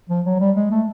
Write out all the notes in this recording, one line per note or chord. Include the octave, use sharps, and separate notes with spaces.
F3
F#3
G3
G#3
A3